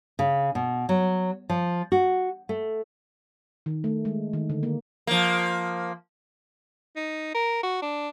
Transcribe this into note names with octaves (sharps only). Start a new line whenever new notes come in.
C#3
B2
F#3
F3
F#4
A3
D#3
A3
G#3
D#3
D3
A#3
F3 A#3
D#4
A#4
F#4
D4